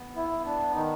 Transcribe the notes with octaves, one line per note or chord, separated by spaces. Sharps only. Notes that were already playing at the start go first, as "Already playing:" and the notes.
Already playing: B3
E4
B3
D4
D#3 D#4